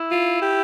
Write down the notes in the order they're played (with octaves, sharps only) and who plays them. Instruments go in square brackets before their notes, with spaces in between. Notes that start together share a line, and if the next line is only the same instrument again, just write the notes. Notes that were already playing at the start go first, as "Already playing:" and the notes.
Already playing: [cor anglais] E4
[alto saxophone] F4
G4